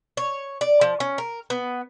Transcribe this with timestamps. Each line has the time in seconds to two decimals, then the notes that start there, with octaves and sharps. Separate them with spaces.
0.17 C#5
0.61 D5
0.81 F3
1.00 C#4
1.18 A#4
1.50 B3